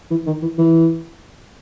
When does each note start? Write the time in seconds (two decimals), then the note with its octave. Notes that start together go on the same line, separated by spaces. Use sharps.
0.11 E3
0.26 D#3
0.42 E3
0.58 E3